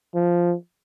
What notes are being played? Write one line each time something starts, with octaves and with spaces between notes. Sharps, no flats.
F3